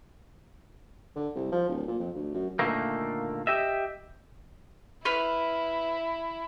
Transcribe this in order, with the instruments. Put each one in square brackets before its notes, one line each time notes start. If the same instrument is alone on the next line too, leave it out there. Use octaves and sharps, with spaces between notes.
[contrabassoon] D3
C2
F3
D1
A#2
F2
D2
F#2
[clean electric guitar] A#2 D3 D#3 A3 A#3
G4 D#5 E5
[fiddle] E4 [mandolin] B4 F6